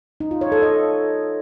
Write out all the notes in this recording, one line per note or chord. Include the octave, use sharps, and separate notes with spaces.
D#4
F4
C#5
A4
D#5